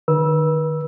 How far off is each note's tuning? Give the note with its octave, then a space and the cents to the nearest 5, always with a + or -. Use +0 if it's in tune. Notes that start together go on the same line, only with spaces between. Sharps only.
D#3 -30 B4 -35 E6 +0